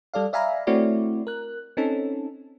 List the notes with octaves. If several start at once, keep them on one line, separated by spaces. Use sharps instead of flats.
G3 A4 D5 F5
D5 E5 F5 G#5 A#5 B5
A3 C4 E4 F#4 C#5 D5
A#4 F#6
C4 C#4 D#4 A4